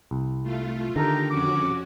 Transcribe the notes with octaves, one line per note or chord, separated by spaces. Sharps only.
C2
A3 F4
D3 D#3 D#4 G4 A4 A#4 A#5
F2 C#4 F#4 D6